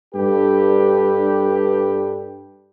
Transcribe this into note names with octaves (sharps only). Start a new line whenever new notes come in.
G2 D4 G4 A4 B4